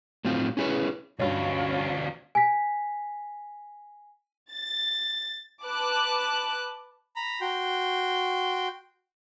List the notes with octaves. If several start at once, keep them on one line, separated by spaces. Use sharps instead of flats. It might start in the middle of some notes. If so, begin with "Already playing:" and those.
A2 F#3 C4 F4
C#4 E4 G#4 A4 B4 C#5
D2 G2 C#4 F4 F#4 C#5
G#5 B6
A6
B4 A5 D6 F#6
A#5 B5
F#4 G5 C6